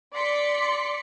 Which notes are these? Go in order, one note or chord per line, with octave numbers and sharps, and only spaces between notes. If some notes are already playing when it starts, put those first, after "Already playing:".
D5 C6 B6 C#7